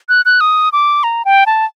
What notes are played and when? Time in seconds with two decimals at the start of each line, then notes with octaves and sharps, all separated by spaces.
0.09 F#6
0.25 F#6
0.41 D#6
0.73 D6
1.04 A#5
1.25 G5
1.46 A5